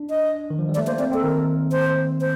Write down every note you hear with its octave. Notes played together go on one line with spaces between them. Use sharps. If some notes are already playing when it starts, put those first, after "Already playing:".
Already playing: D4
D#5
D#3
F3
G3
D5
A3
A#3 C5
C4 D5
C4 A4
D#3 A#4
C5
C5